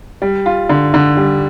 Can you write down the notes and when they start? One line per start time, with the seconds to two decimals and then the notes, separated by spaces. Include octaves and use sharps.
0.22 G3
0.46 F4
0.69 D3
0.94 D3
1.17 G3